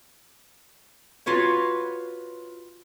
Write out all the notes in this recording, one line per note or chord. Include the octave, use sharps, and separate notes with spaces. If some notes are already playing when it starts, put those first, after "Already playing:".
F4 F#4 B4 C#5